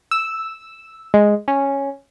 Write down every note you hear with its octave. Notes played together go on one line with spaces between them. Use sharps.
E6
G#3
C#4